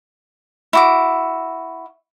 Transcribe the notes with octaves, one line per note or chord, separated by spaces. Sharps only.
E4 F#4 D6